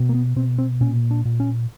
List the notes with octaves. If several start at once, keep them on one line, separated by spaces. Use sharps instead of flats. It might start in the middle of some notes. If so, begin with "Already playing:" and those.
Already playing: B2
A#3
B3
B2 C4
C4
A#2 C#4
D4
A#2
C#4